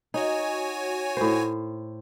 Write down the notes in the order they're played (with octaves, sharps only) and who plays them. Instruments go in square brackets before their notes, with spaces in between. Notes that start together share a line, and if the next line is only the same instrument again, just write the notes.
[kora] D#4 [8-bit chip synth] F#4 C#5 G#5
[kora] A2 C5